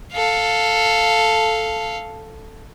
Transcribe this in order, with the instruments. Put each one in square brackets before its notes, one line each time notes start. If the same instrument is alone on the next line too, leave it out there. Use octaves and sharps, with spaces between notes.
[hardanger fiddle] A4 F5